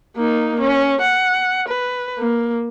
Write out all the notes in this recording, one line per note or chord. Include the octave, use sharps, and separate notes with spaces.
A#3 D#4
C#4
F#5
B4
A#3